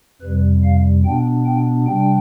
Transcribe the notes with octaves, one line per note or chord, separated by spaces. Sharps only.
F2 C3 G3 B4
F5
B2 B3 D4 G5
G5
C3 G3 D4 G5